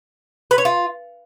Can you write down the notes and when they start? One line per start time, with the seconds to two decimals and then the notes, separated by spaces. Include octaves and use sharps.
0.51 B4
0.58 C#5
0.65 F4